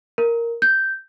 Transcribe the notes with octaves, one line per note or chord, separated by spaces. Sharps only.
A#4
G6